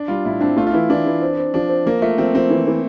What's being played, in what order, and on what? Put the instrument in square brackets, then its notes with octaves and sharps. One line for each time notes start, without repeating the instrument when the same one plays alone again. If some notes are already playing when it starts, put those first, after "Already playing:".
Already playing: [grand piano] D4
[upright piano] G3 [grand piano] F4
[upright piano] A2 [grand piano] E4
[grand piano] C4 [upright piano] D4
[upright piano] A3 [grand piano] F4
[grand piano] F4
[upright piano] E3 [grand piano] E4
[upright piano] E3 [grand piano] D4
[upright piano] E3
C4
C4
[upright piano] F3 [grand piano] D4
[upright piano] C4
[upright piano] F3 [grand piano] A#3
[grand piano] A3 [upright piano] F4
[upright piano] F3 [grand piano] C4
[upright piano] F3 [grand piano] C4
[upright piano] E3
E3